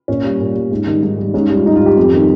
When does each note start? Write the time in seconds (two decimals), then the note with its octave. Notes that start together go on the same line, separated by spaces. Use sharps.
0.08 A#2 C#4
0.24 G3
0.40 A#2
0.55 G3
0.71 G#2
0.87 D#3 G3
1.03 G#2
1.18 D#3 G3
1.34 G#2 C#4
1.50 G3
1.55 F4
1.65 G#2 D#4
1.76 F4
1.81 G3 G4
1.97 F2
2.12 D#3 G3